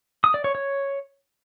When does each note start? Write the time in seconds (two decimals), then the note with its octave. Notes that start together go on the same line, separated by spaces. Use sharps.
0.24 D#6
0.34 D5
0.44 C#5
0.55 C#5